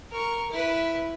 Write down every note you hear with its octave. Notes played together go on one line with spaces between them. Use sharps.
A#4 C#6
E4 B4